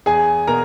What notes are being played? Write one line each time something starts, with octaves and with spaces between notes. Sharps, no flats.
E2 G#4 G#5
B2 A#4 A#5